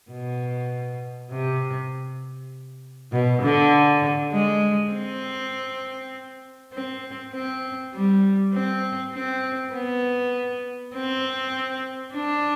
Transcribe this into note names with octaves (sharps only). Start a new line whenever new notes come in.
B2
C3
B2
D3
G#3
C4
C4
C4
G3
C4
C4
B3
C4
D4